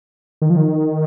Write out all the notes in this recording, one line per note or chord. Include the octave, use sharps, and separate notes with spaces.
D#3
F3
D#3